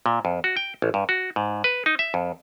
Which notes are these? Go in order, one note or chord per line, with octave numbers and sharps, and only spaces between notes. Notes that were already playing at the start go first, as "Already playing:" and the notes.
A#2
F2
F#4
G5
A1
G2
F#4
G#2
B4
D#4
E5
F2